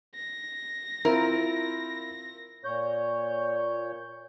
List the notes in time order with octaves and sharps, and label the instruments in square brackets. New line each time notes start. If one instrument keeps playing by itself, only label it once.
[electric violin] A#6
[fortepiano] C4 E4 F4 [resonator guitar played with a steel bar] A#4
[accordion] A#2 C#5 G6